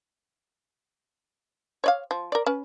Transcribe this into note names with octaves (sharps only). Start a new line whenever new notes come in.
C#5 D5 F5
F3
A#4 D5
C#4 B4